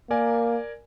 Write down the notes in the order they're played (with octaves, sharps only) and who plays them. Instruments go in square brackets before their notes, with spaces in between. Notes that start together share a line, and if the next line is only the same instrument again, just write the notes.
[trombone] A#3 [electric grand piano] A#4 D5 G#5